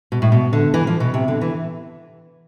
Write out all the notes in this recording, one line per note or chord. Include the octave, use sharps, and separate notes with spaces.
B2
A2
B2
D3
E3
F3
B2
C3
D3
E3